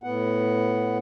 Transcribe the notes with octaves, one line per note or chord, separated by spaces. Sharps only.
A2 B3 F#5